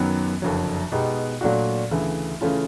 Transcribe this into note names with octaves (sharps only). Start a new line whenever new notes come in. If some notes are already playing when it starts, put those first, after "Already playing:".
Already playing: F#2 D#3 F#3 B3
F#1 F2 D3 F#3
B2 G#3 B3 D#4 G4
A#2 F#3 A3 D4 F#4
D2 C#3 E3 A3
C#3 E3 A3 C#4 F4